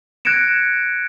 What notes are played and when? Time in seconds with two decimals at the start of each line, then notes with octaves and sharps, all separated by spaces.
0.25 F#6 G#6 A#6 C#7 D7 E7